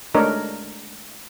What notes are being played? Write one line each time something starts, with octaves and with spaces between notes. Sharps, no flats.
G#3 A3 D4 A#4 C#5 D#5